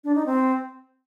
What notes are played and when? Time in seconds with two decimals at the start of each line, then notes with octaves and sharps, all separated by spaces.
0.04 D4
0.15 D#4
0.26 C4